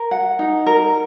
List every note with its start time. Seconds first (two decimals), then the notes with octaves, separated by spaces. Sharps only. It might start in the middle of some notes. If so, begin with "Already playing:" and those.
Already playing: A#4
0.11 F#5
0.39 D#4
0.66 A#4